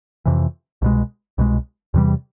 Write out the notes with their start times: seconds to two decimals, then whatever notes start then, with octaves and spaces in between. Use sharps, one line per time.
0.25 F2 C3 E3
0.82 C2 B2 G#3
1.38 C2 B2 G#3
1.94 E2 C3 E3 G3